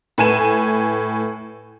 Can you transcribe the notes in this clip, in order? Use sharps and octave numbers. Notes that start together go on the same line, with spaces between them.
A2 B4 G#5 D#7 E7